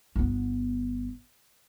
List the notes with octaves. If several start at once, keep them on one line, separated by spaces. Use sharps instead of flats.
G1 B3